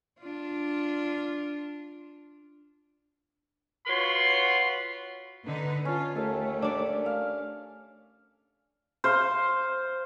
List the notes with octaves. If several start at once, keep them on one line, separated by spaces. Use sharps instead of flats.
D4 F4
F4 F#4 B4 C#5 C6
D3 D#4 B4
C#4 F4 A5
D#2 A3 A4
D4 D5
F5
C5 F5